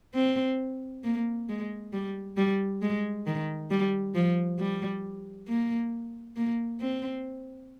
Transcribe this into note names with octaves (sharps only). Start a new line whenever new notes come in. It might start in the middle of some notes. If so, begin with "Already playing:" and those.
C4
A#3
G#3
G3
G3
G#3
D#3
G3
F3
G3
A#3
A#3
C4